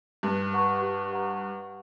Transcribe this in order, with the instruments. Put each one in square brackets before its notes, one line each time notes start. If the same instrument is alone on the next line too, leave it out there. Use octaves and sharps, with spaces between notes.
[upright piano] G2 [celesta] G4
[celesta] B4 F#5 A#5 C#6
G4
B4 F#5 A#5 C#6
G4